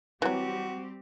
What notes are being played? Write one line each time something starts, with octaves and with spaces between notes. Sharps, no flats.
E3 F#3 G3 C4 F#4 G4